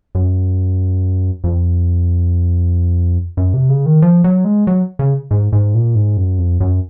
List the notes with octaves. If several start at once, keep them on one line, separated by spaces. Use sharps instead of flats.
F#2
F2
F#2
C3
C#3
D#3
F3
F#3
G#3
F#3
C#3
G#2
G#2
A#2
G#2
F#2
F2
F#2